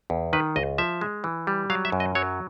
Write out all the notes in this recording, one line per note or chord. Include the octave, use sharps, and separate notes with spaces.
E2
D#3 B4
C#2 D#5
F3 E5
G#3
E3
G3
F#3 F5
E5
F#2
D#5
F#3 C#5